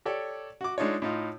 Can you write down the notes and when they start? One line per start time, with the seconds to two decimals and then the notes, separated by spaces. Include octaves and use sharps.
0.05 G4 A4 C#5 D5
0.61 F#4 D6
0.78 G#3 D4 D#4 F4 C#5
1.02 A2 D#4 F4